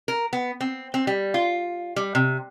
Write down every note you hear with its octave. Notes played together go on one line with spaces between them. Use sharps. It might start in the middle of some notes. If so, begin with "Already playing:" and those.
A#4
B3
C4
C4
G3
F4
G3
C3